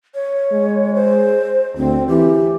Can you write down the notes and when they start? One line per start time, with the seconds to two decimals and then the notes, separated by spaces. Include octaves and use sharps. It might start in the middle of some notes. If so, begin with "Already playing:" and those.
0.15 C#5
0.52 G#3
0.95 C5
1.77 D2 C4
2.08 E3 G4